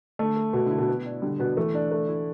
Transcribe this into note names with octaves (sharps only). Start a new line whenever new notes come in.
D3 A3
A3
B2 B3
D3 E4
B2
B3
D4
D3 G3
B2 B3
E3 A3
D4
A3
E4